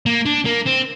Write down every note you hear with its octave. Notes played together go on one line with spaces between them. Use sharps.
A#3
D4
A#3
C4